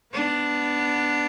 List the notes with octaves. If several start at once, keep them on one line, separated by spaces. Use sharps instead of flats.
B3 D4